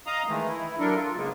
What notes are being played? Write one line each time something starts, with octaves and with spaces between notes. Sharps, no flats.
D#5 F5 A#5 D#6
D#3 E3 G#3 A3
E4
F#3 D4 A4 A#4
F4
C#3 G#3 A#3 B3